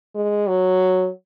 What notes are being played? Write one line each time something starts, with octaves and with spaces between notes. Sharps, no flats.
G#3
F#3